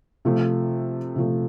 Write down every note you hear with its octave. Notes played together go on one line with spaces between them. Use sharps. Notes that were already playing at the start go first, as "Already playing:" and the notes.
C3 F3 A3
C3 F3 A3